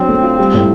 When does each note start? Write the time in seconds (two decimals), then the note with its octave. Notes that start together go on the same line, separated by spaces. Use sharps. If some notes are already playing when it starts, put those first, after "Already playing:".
Already playing: F#3 C4 D4
0.09 A3
0.23 F4
0.38 G3
0.54 A2